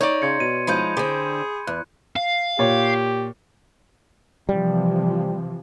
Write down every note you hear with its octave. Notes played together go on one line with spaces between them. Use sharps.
D#4 C#5 D5
C#3 C6 G#6 C#7
B2 D#7
F3 G#3 D#4 B5 G6 D#7
D3 C4 G#4
E2 F#6
F5
A#2 G4 C#5
C3 E3 F3 G3